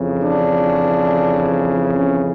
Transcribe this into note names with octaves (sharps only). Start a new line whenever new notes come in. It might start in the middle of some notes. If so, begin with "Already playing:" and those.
Already playing: F2 C#3 E3
D4
C#4